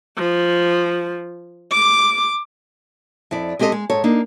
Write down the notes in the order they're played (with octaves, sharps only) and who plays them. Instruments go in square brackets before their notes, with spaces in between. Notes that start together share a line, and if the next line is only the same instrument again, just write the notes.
[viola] F3
D6
[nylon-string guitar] F2 E4 D5
G#3 C4 G4 A4 D#5
G#3
G#2 A4 C#5
A#3 D4 D#4